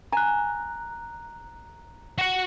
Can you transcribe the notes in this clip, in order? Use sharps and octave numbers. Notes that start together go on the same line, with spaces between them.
G#5 A#5 F#6
F#4 F#5